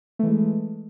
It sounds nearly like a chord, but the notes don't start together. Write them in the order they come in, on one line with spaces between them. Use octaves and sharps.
A3 E3 G#3